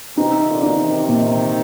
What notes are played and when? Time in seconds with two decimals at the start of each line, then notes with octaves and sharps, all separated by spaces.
0.17 C3 D#4
0.48 A#2 D3
0.63 D#4
0.78 C3 D#3
1.09 A#2